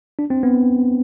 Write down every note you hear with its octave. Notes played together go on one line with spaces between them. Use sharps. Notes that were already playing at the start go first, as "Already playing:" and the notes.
D4
C4
B3